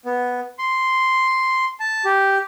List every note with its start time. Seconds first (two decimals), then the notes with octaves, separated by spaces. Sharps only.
0.05 B3
0.59 C6
1.80 A5
2.05 G4